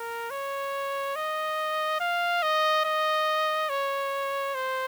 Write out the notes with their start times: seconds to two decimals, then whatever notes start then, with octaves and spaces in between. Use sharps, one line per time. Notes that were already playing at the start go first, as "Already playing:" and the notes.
Already playing: A#4
0.30 C#5
1.16 D#5
2.00 F5
2.42 D#5
2.85 D#5
3.69 C#5
4.55 C5